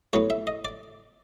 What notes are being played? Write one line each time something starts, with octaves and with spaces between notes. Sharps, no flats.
A2 F#3 B3 C#5
E5
D#5
D5